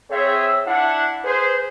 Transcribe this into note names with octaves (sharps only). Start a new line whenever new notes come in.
C4 G#4 C#5 E5
D4 E4 F#5
G#4 B4 C5